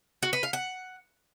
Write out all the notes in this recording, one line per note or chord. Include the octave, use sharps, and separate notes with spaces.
F#4
B4
F5
F#5